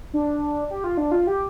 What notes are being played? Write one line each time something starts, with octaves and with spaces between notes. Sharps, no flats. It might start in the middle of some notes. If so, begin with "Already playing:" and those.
D4
G4
F4
D4
F4
G4